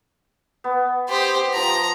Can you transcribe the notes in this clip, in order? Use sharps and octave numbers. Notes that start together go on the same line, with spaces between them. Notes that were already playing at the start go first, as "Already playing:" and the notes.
B3
G4 C5
F3 A5 A#5